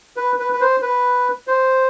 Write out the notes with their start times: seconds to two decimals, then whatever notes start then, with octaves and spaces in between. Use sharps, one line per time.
0.17 B4
0.39 B4
0.53 B4
0.61 C5
0.82 B4
1.48 C5